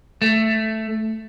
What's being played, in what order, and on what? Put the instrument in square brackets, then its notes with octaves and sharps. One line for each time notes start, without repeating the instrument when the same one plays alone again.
[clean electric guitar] A3